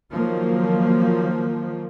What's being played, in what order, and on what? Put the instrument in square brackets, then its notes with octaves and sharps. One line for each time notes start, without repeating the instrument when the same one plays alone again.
[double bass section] D#3 F3 F#3 A#3